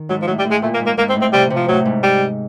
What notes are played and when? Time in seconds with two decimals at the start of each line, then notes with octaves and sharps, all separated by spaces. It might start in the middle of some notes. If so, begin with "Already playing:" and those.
Already playing: D#3
0.09 G#2 F#3
0.22 F3
0.27 A2 F#3
0.39 G3
0.45 A2
0.51 G#3
0.62 A#2 A3
0.74 A#3
0.80 G#2
0.86 A#3
0.98 G#2 A#3
1.09 C4
1.15 A2
1.22 C4
1.33 C3 G3
1.50 C3
1.56 F3
1.68 A2 F#3
1.85 G#2
2.03 G3